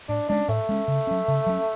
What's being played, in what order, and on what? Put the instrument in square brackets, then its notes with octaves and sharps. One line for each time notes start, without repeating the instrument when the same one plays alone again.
[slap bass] A2 [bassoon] D4
[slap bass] G#3 C#4 [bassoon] D4
[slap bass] A2 [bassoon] A3
[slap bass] G#3 C#4
C#3
F#3 C#4
C#3
F#3 C#4